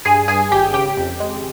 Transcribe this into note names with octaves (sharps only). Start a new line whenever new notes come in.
G2 G#4 G#5
G2 G#4 G#5
G#1 G4 G5
C#3 G4 G5
F2
G#3